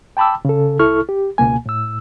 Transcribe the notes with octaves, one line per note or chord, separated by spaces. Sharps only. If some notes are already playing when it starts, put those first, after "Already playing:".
G5 A5 B5 D6 E6
C#3 A4
C2 E4 A4 C#6 F6
G4
C#2 B2 A#3 G#5
A2 E6